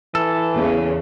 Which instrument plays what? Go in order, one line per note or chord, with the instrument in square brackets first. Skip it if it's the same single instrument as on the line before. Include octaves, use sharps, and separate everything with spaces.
[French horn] E3 [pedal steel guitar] A4
[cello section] E2 C#3